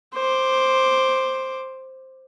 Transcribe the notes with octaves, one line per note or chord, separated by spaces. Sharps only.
C5 D6